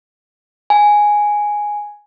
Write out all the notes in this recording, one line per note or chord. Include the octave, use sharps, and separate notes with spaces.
G#5